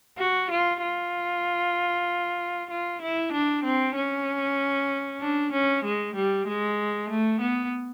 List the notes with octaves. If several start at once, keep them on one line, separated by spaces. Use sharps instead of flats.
F#4
F4
F4
F4
E4
D4
C4
C#4
D4
C#4
G#3
G3
G#3
A3
B3